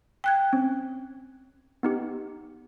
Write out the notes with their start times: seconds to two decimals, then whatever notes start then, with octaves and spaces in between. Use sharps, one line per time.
0.24 G5 F#6 G#6
0.53 C4 C#4
1.83 B3 D#4 G4